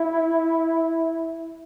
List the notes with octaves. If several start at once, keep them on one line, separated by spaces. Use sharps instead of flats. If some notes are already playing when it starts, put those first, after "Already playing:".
Already playing: E4